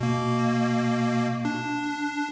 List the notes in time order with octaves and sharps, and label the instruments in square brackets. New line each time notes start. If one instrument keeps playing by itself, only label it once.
[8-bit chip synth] B2 A#3
D4